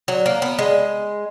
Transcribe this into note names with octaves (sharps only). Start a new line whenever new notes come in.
F#3
A#3
B3
G#3